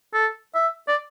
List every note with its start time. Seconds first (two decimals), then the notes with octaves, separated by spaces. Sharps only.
0.14 A4
0.55 E5
0.88 D5